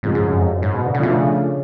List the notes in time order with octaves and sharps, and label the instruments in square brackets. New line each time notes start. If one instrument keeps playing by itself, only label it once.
[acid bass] G#2 [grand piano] C#3 F3 G#3
[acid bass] G#2
F#2
F2
F#2
G#2
B2
D3
C#3
[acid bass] B2 [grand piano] F3 A3 D4 F4
[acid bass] C#3